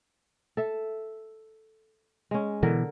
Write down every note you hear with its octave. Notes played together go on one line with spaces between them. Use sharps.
A4 E5
G#3 C#4
B2 D3 E3 A#4